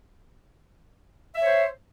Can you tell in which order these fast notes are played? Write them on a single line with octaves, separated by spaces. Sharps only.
E5 C#5 C5